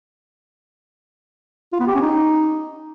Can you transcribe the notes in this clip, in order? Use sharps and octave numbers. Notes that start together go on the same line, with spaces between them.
F4
B3
G4
C#4
D#4